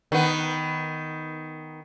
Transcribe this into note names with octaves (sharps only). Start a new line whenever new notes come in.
D#3 B3